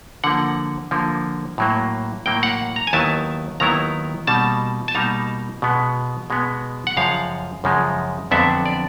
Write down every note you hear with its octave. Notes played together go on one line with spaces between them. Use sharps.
D3 F3 A#3 F#5
D3 F3 A#3
A2 F#3 A#3
A2 F#3 A#3 G5
F#5
A#5
G#5
D#2 D#3 F#3 B3 E4 A5
D#2 D#3 F#3 B3 E4 A#5
B2 G3 A#3 D#4 A5
A5
B2 G3 A#3 D#4 A#5
B2 G#3 B3
B2 G#3 B3
F#5
F#2 C#3 F3 G#3 F5
F#2 C#3 F3 G#3
F2 D3 F#3 B3 D4 E5
D5